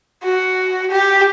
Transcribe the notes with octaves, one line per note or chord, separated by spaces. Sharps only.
F#4
G4